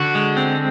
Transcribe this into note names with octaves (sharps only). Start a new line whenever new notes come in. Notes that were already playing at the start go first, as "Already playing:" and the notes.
Already playing: D3 F#4
G#3
C4